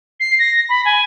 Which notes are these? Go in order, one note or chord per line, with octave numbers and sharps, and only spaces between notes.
C7
A#6
B5
G#5